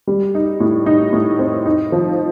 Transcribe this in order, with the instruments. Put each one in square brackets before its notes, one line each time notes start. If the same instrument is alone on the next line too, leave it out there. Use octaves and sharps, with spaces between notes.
[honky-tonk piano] G3
D#4
A2
D#4
A2
C4
D#4
F3